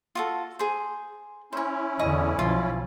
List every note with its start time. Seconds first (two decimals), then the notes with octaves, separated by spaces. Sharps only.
0.15 F4 F#4 A4
0.59 G#4 C5
1.53 C#4 E4 C5 C#5
1.99 E2 D3 D#5 C#6 D#6
2.39 B1 F3 F4